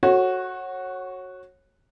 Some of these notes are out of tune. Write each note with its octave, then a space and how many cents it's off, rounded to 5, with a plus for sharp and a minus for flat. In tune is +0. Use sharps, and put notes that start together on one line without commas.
F#4 +0 A4 +0 C#5 -25